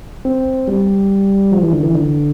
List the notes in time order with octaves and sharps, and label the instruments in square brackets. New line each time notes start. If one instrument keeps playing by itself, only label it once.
[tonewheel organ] C4
G3
F3
E3
D3
E3
D3